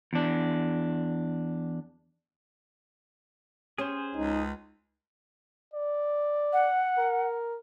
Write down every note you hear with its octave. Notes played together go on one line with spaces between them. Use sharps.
E2 D4
C#4 G4 G#4 C5 C#5
C#2 D#4
D5
F#5
A#4